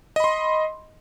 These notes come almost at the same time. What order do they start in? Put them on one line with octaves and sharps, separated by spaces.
D#5 B5 C6